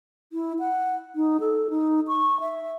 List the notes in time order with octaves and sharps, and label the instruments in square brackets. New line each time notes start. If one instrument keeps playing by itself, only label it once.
[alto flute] E4
F#5
D#4
A4
D#4
C#6
E5